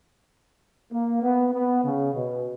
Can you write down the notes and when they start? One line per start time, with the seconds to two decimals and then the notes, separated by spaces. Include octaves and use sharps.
0.92 A#3
1.23 B3
1.53 B3
1.83 C#3
2.14 B2